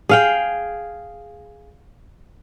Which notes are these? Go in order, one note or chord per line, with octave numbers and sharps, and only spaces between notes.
G#4 F5 G5